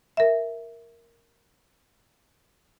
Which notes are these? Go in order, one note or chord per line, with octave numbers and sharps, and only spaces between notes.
A#4 E5